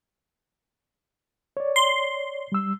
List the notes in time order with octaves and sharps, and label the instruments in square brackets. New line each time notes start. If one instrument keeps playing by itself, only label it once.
[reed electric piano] C#5 D5
[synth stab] C6
[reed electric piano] G3 E6